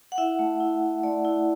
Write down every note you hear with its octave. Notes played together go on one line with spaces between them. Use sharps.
F#5
E4 E5
A3
E4
E4
A3 D5
E4